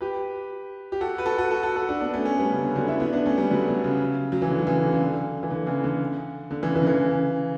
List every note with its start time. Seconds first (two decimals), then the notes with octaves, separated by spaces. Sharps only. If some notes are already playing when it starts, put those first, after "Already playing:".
0.01 G4 B4
0.92 G4
1.01 F#4 A4
1.18 B4
1.26 F#4 A4
1.38 F#4 A4
1.51 F#4 A4
1.63 F#4 A4
1.76 F#4 A4
1.89 D4 F#4
2.01 B3 D4
2.13 A3 C#4
2.25 A3 C#4
2.38 G3 B3
2.51 C#3
2.63 D3
2.76 D3 F#3
2.88 C#4 E4
3.00 B3 D4
3.13 B3 D4
3.26 A3 C#4
3.38 G3 B3
3.51 D3 F#3
3.68 D3
3.84 C#3
4.32 F#3
4.42 E3
4.50 D3
4.59 F#3
4.67 C#3 E3
4.83 D3
4.92 C#3
5.02 D3
5.43 E3
5.50 D3
5.66 C#3 E3
5.84 D3
6.51 D3
6.63 C#3 E3
6.75 C#3 E3
6.82 D3
6.87 C#3 E3